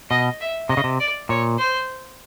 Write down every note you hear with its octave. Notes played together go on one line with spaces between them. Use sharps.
B2 D#5
E5
C3 D#5
C#3
C3
D5
A#2 C#5
C5